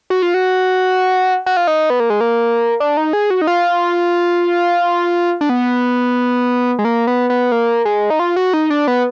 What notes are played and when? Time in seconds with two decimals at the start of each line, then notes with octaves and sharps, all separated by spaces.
0.10 F#4
0.22 F4
0.34 F#4
1.46 F#4
1.57 F4
1.67 D#4
1.90 B3
2.00 A#3
2.10 G#3
2.21 A#3
2.80 D4
2.97 D#4
3.13 G#4
3.30 F#4
3.42 D#4
3.47 F4
5.41 D4
5.49 B3
6.79 G#3
6.85 A#3
7.07 B3
7.30 B3
7.52 A#3
7.85 G#3
8.10 D#4
8.19 F4
8.36 F#4
8.54 D#4
8.70 D4
8.87 B3